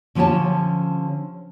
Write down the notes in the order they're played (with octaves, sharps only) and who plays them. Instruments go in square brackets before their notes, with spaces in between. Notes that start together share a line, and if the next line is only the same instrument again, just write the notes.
[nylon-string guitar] D3 F3 C#4 G4 C#5 A5